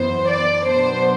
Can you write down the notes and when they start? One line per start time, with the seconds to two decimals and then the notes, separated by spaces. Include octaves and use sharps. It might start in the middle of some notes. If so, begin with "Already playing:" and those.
Already playing: F#2 E3 B3 C5
0.29 D5
0.65 B2 F#3 B3 D4 C5